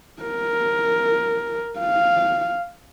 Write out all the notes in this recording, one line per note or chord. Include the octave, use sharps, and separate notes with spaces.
A#4
F5